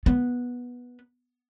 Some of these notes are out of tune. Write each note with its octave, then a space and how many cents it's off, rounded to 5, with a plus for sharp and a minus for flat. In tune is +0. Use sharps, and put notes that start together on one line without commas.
B3 -10